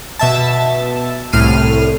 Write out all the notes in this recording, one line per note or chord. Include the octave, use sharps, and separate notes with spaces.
B2 E5 A5
C2 A2 F6 C7 D#7